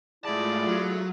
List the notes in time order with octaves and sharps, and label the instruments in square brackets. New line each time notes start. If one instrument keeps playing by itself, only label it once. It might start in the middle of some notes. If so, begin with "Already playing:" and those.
[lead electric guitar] G#2 A5 [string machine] A3 F4 [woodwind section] E4 G#4 [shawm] D5
[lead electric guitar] F#3